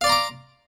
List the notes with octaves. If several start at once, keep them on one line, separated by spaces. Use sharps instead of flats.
D5 F5 A#5 C6 D6